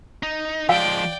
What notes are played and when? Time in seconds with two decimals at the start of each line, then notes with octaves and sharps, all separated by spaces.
0.23 D#4
0.69 F3 G#3 D5 F5 G5